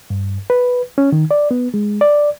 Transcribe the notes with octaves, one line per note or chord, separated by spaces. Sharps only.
G2
B4
C#4
D#3
D5
B3
G#3
D5